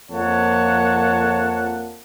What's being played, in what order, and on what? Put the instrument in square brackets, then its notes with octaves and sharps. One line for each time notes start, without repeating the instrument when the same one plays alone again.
[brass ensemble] F2 F3 A#3 C#5 F#5 A5